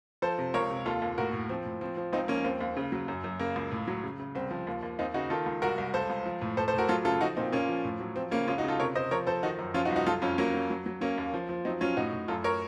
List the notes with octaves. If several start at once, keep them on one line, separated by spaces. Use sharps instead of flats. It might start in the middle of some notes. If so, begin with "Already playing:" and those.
F3 A4 C5
C3
C#2 A#4 C#5
C3
D#2 F4 A4
D#2
A2 F#4 A#4
A2
F3 C4
A2
F3 C4
F3
C#2 C4 D#4
F3 A#3 C#4
D#2 C4
D#2
C#3
F#3
F#2
F#2
C#3 A#3
C#2
A2
F#3
C#3
C#3
C2 C4
F3
D#2
D#2
D#2 C4 D#4
C#3 D#4 F#4
D#3 F4 A4
C#2
C2 F#4 A#4
C2
C#2 A4 C5
C#2
F3
A2
A2 A4 C5
A4 C5
A2 F#4 A#4
F#3 F4 A4
C#3 F4 A4
F3 D#4 F#4
A#2 C4 D#4
A#2 A#3 C#4
F3
A2
F#3
F3 C4
C#3 A#3 C#4
C#2 C#4 F4
D#4 F#4
C#3 F4 A4
C3 A#4 C#5
C3 C5 D#5
F3 A#4 C#5
F3 A4 C5
D#3 D#4 F#4
F#2
F3 C#4 F4
D#4 F#4
C2
D#4 F#4
F#3 F4 A4
F2 C#4 F4
F#3 A#3 C#4
F#3
F#3
F#3
F#3 A#3 C#4
D#2
F3
F3
F#3 C4 D#4
F#3 C#4 F4
A2 D#4 F#4
A2
F#2 F4 A4
A#4 C#5